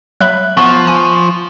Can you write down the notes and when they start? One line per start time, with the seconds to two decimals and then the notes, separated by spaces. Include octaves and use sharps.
0.21 F#3 E5 B5 F#6
0.57 F3 B3 C#6
0.87 G#5